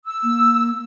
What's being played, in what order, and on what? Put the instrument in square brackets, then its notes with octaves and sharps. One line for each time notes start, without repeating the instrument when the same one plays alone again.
[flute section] E6
[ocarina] A#3